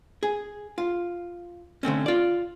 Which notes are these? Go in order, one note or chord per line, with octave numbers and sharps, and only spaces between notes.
G#4
F4
D3 A3 C4 C#4
F4 D5